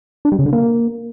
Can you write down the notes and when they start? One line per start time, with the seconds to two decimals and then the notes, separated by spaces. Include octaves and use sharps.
0.25 D4
0.32 G3
0.39 C#3
0.46 D3
0.53 A#3